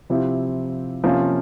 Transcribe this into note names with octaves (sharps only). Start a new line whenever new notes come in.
C3 F3 C4 E4 G4
C3 F3 A#3 C#4 F4